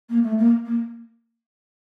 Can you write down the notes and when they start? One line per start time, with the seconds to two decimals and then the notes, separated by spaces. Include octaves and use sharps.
0.09 A#3
0.23 A3
0.38 A#3
0.65 A#3